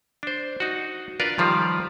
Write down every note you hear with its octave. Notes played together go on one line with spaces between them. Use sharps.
D4 C5
D#4 F#4
D4 F4 A#4 B4 D5
D#3 F3 G3 F4